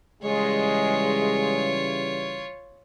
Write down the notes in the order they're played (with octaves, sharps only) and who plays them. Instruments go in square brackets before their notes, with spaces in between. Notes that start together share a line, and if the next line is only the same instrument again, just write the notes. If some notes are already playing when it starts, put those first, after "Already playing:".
[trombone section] C#3 E3 G3 [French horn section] G#3 [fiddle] F4 C#5